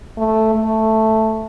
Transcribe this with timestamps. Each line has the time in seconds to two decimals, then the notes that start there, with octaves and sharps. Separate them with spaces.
0.18 A3
0.55 A3